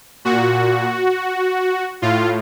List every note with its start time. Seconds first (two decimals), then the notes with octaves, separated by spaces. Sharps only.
0.25 A#2 F#4
2.02 A2 F4